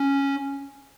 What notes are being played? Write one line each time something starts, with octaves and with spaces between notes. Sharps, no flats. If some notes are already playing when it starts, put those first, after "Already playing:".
Already playing: C#4